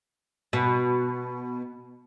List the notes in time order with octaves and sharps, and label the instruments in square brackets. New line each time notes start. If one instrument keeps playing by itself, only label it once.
[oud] B2